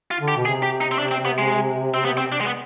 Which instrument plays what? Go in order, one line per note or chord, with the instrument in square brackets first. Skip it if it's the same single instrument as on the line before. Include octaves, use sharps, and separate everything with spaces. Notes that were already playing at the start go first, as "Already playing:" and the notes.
[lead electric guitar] F4
[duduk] D3
[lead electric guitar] G4
[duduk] B2
[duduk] C3 [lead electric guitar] G#4
[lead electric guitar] G4
D#4
C4
D4
C4
B3
G#3
C4
B3
C4
D4
G#3
B3